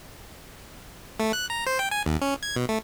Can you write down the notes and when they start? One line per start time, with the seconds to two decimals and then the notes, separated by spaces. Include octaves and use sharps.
1.20 A3
1.33 F#6
1.50 A#5
1.67 C5
1.79 G5
1.91 G#5
2.06 D#2
2.21 C#4
2.43 G#6
2.56 B2
2.69 A3